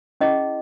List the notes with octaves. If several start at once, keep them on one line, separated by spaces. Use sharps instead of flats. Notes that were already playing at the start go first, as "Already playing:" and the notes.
C#4 E4 G#4 D#5